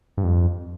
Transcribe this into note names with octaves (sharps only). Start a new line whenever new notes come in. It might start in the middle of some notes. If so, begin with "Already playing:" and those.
G2
F2